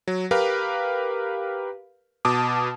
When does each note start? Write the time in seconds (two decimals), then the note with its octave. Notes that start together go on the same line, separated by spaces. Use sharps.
0.07 F#3
0.31 G4 A#4 B4 F5
2.25 B2 A5 D6 D#6